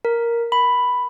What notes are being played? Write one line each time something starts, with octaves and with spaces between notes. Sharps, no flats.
A#4
B5